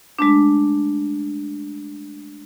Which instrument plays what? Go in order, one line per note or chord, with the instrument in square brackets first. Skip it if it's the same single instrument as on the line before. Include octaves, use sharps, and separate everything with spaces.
[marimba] G#3 A3 D4